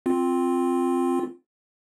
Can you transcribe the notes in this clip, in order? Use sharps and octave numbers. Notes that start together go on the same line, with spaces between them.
C4 F4